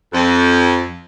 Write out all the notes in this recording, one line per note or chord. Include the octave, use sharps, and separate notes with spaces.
F2